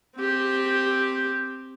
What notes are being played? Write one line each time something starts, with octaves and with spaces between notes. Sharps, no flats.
C4 G4